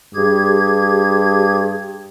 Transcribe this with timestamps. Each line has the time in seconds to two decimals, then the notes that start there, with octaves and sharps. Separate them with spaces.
0.15 G2 G4 G#4 G#6